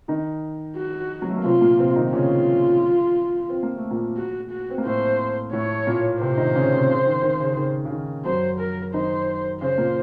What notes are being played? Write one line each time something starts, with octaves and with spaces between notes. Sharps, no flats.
D#3 D#4
F#4
F#3
A3
A#3
C3 C4 F4
A#2 A#3
C3 C4
D#3 D#4
C#3 C#4 F4
C4
A#3
A3
A#2 A#3
F#4
F#4
C4
A#3
A2 A3 C5
A2 A3 C#5
A#2 A#3
C3 C4 C5
D#3 D#4
C#3 C#4
C3 C4
C#3
D#3
D#3
C#3
C#3
D#3
C#3
D#3
F#2 F#3 C5
A#4
D#3 D#4 C5
C#3 C#4 C5
A#2 A#3